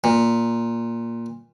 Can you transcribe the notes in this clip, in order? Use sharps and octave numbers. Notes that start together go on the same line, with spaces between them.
A#2